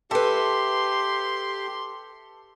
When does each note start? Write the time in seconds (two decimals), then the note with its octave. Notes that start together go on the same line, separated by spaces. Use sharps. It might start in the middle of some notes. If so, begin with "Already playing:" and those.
0.11 G4 A4 B4 E5 C6